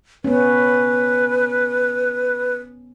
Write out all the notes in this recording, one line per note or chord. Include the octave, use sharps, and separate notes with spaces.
B3 C#4 B4